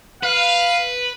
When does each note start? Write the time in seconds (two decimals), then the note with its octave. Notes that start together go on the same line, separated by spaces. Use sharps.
0.23 B4 F5